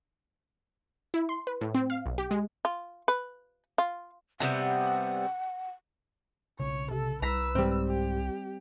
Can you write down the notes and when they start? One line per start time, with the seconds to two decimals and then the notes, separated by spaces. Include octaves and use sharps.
1.14 E4
1.29 C6
1.47 B4
1.61 A2
1.75 C4
1.90 F5
2.06 B1
2.18 G4
2.31 G#3
2.65 F4
3.08 B4
3.78 F4
4.40 C3 G3 B3 F#5
6.60 B1 C#3 C#5
6.91 C3 A4
7.22 C2 B4 A#5 E6 B6
7.55 G#2 G3 C4
7.86 G4